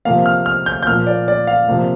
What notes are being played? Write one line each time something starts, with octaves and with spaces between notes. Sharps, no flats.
C3 F3 A#3 F5
F6
F6
G6
G6
A#2 F3 A#3 F6
D5
D5
F5
C3 F3 A#3